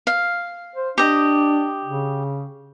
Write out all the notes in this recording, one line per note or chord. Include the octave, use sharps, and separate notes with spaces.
F5
C5
D4 G4 D#5
C#3